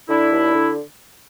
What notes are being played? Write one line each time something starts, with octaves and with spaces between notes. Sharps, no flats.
D3 D4 E4
D#2
D3